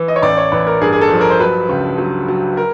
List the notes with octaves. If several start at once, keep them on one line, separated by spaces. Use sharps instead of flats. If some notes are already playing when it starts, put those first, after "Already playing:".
Already playing: E3
D#5
C#5
A1 D5
C#5
A1 B4
A#4
G2 G#4
G#4
A4
F3
A#4
C5
F#3 B4
C#2
F#3
F#3
A#4